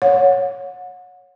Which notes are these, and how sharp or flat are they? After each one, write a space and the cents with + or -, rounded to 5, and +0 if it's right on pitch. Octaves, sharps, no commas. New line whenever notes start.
C#5 +0 F#5 -35